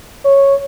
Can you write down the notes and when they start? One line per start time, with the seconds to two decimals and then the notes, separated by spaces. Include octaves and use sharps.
0.25 C#5